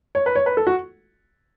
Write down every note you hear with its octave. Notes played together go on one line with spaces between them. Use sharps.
C#5
B4
C#5
B4
A4
F#4